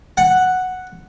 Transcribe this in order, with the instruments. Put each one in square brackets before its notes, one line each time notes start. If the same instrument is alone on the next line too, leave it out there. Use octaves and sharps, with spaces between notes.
[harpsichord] F#5